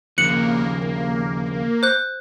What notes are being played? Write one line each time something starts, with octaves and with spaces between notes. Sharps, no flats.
D#2 C#3 F3 A#3 F#6 C#7 F#7
C5 F#6